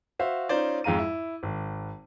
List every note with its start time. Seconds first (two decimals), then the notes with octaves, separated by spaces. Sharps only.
0.19 F#4 C5 E5 F5
0.49 C#4 D#4 F4 C5 D5
0.84 F2 G#2 F5 A#5 D#7
0.99 E4
1.43 G#1